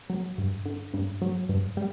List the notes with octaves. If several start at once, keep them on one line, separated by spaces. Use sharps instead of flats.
F#3
G2
D3
G2
F#3
G2
G3